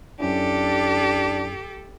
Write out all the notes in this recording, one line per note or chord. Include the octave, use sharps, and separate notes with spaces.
F#2 C#4 D4 E4 G4 A4